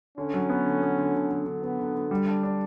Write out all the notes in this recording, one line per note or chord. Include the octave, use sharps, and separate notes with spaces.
D3 C#4
F#3
B3
D3
B3
D3
D3
D3
D3
D3 B3
D3
D3
G3
D4
D4